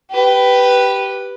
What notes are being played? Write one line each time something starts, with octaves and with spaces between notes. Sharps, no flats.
G4 B4